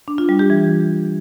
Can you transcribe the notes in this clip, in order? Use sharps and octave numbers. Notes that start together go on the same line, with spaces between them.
D4
F4
G3
G4
E3